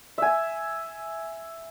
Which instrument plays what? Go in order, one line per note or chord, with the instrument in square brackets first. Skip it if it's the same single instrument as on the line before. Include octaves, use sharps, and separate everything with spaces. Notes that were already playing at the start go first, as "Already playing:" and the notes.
[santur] E5 G#5